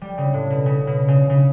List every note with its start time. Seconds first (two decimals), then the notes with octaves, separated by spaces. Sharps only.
0.01 G3
0.18 C#3
0.34 A2
0.50 B2
0.66 C#3
0.87 B2
1.08 C#3
1.30 C#3